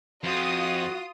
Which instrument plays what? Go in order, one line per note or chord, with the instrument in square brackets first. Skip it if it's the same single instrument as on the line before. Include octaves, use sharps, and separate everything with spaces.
[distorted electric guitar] F2 [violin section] F4 D#6 [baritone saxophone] F#4